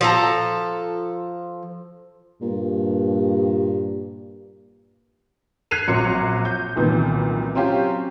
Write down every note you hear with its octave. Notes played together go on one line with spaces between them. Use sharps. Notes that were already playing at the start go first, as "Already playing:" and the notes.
F3 A4 A#5
G2 A#2
F#6 G#6 B6 C7 D#7 F7
A#1 F#3 C4 C6 C#7
G6
C2 F#2 A#2 D#3 E3 B3
F#3 C4 C#4 F4 G4